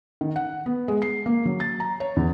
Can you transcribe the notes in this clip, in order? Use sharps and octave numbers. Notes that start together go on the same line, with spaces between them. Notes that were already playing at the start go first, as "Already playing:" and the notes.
D#3
F#5
B3
G#3
C7
A#3
F#3
A6
A#5
C#5
E2